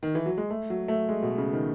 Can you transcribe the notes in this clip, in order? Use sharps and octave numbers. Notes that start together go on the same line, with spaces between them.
D#3
E3
F#3
G#3
A3
F#3
A3
G#3
B2
C#3
D#3